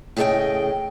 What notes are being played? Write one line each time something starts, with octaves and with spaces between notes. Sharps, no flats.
A2 C#3 G#4 B4 D#5 G5